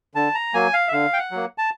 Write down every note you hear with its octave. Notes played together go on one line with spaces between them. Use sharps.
D3 A5
A#5
F#3 A#3 G#5
F5
E5
D3 F5
G5
F#5
F#3 A#3
A5